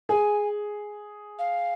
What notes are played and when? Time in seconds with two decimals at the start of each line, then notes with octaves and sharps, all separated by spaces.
0.09 G#4 G#5
1.39 F5